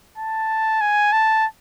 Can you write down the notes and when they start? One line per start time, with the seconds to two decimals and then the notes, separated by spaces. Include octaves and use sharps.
0.18 A5
0.81 G#5
1.12 A5